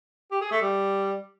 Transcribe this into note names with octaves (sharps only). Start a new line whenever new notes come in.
G4
G#4
A3
G3